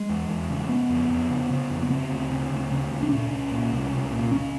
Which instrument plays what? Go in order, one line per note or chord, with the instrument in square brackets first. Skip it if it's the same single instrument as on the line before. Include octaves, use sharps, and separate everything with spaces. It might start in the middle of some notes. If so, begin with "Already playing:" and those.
Already playing: [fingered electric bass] G#3
E2
E2
C#3
C#3 B3
F2
F2
C#3
C#3
F2
B3
C#3 C4
D2
C#3
D2
C#3
D2
D4
A#2 C#4
C2
A#2
C2
C2
A#2
C#2 C#4